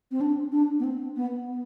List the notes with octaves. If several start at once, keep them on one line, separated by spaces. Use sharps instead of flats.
C4
D4
D4
B3
C4
B3
B3